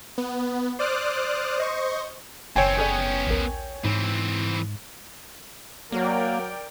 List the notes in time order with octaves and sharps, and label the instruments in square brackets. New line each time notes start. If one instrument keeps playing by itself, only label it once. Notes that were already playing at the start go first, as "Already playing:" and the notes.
[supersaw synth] B3
C5 D5 D6 D#6 F6 F#6
C5 D#5 C#6
[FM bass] F#1 [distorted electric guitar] D#2 C4 [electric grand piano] C#5 G5 G#5
[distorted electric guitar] B3 C#4 [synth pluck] G#4 A4 D5
[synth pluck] A#1 D#2 A#4
[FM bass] G#2 [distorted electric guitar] E3 C4
[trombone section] F#3 [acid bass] A#3 [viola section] A#4 D5 G5